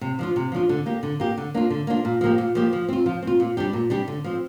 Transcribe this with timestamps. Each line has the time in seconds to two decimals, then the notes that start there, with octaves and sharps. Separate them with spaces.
0.01 C3
0.19 F3 D4 F4
0.36 C3
0.52 F3 D4 F4
0.69 D3
0.86 A#3 G4
1.03 D3
1.20 A#3 G4
1.38 D3
1.54 A#3 D4 F4
1.70 D3
1.87 A#3 D4 F4
2.05 A#2
2.21 F3 A#3 G4
2.38 A#2
2.55 F3 A#3 G4
2.73 F3
2.89 C4 F4
3.06 F3
3.23 C4 F4
3.40 A#2
3.57 G3 D4 G4
3.73 A#2
3.90 G3 D4 G4
4.08 D3
4.24 F3 C4